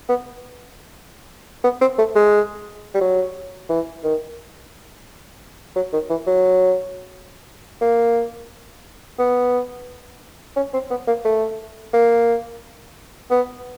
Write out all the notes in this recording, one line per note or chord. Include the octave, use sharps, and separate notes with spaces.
B3
B3
C4
A3
G#3
G3
F#3
E3
D#3
F#3
D#3
E3
F#3
A#3
B3
C#4
C4
B3
A#3
A3
A#3
B3